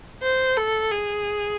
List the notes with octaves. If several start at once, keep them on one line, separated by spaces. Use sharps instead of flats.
C5
A4
G#4